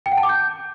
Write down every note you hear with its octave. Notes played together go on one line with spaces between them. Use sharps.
G5
F#5
A5
D6
G6